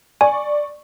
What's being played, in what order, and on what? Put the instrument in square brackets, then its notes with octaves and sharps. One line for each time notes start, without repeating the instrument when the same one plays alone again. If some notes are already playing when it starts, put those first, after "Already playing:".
[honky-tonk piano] D5 C#6 [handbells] G#5